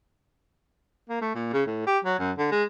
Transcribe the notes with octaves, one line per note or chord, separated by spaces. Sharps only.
A#3
A3
A#2
C#3
A2
G4
F#3
F#2
D3
G#3